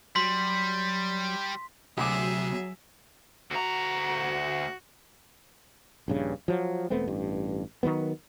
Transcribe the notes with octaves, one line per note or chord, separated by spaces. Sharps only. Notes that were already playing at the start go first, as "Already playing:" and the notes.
F#3 G3 C6 B6
D2 C3 F#3 G#4 E5 D6
D2 F#4 A#5
A#1 G2 C#3
F3 F#3
E1 A3 B3 C4
A1 G2
D#3 E3 F#3 B3